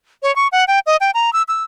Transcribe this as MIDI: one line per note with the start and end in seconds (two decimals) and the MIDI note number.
0.23 0.34 73
0.36 0.48 85
0.52 0.65 78
0.68 0.79 79
0.86 0.96 75
1.01 1.11 79
1.14 1.33 82
1.33 1.43 88
1.48 1.63 88